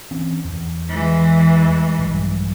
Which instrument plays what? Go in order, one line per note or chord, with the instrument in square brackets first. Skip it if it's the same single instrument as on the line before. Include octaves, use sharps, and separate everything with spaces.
[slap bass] E3 C4 C#4
E2
[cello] E3 G#3
[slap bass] A#1 G2 F#3